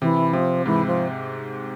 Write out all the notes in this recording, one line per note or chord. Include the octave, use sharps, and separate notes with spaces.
C3 E3
C3 F3
G#2 E3
F3